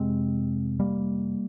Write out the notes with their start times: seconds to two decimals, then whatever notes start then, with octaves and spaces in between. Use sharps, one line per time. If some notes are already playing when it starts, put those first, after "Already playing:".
Already playing: F2 C3 G#3 C4
0.80 G3 A#3